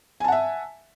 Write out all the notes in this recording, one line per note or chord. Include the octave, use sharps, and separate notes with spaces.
E5 F#5 G#5 A5